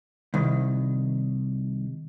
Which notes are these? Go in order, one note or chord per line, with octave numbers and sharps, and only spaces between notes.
C2 D#3